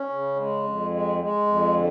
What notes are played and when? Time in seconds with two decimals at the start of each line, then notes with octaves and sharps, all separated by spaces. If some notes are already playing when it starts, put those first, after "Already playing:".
Already playing: C#4
0.09 C#3
0.36 G#3
0.64 F2
0.91 G#3
1.18 G#3
1.46 F2
1.74 D3